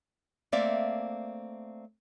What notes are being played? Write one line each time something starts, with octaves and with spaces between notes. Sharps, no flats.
A3 A#3 C4 D5 E5 F5